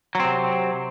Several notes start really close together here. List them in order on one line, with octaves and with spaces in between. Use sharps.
F#3 C4 C3